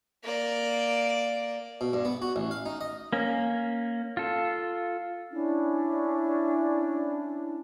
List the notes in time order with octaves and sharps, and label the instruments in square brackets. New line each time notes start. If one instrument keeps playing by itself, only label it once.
[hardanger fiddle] A#3 D5
[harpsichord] B2
G2
B3
F#4
A1
F5
D#4
D#5
[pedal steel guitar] A#3 C#4
F4 A4
[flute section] C#4 D4 E4